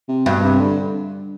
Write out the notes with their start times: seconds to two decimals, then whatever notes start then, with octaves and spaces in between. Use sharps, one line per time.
0.09 C3
0.26 G2 B2
0.43 C3
0.60 D3